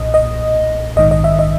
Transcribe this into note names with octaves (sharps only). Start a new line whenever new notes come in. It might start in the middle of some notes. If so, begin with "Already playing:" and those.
Already playing: B1 A#2 D#5
D#5
A#1 G#2 D#3 D#5
D#5
E5
D#5